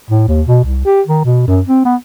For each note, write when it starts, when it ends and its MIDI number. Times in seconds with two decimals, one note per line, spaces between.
0.10 0.23 45
0.28 0.42 39
0.47 0.60 47
0.64 0.83 36
0.85 1.01 67
1.06 1.23 51
1.25 1.43 47
1.48 1.61 42
1.68 1.81 60
1.85 1.96 59